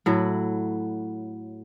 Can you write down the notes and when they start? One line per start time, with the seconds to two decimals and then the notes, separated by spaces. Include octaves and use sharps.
0.06 A2 F#3 E4